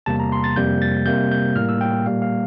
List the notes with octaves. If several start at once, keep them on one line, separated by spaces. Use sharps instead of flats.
E2 C3 G3 A#3 A5
A#5
C6
A6
F2 C3 G3 A#3 G6
A6
C3 G3 A#3 G6
G6
A2 G3 A#3 F6
E6
G5
A#2 G3 A#3 F5
F5